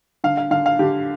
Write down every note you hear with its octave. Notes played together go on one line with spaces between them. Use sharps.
D3 F5
F5
D3 F5
F5
D3 G4